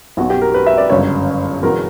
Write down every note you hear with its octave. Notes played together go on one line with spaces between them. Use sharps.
B1 B2 F#3 F#4
G4
A#4
B4
E5
D5
G1 F#2 C#3 C#5
E1 E2 B2 F#3 A#4